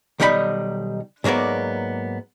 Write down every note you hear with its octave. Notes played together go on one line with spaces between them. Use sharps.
B1 D#3 G3 D#4 B4 B5
G#2 F#3 A#3 B3 D5